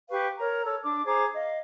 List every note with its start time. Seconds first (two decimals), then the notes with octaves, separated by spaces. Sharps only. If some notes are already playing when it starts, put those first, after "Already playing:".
0.09 G4 B4 F5 C#6
0.38 A#4 C#5 A#5
0.65 A4 C#5
0.83 D4 D6
1.05 G#4 C5 A#5 D6
1.34 D#5 F5